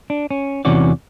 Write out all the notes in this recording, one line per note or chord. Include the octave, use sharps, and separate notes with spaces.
D4
C#4
E2 C3 E3 C#4 F#4 D5